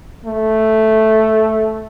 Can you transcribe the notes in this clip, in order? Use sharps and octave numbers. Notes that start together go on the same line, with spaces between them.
A3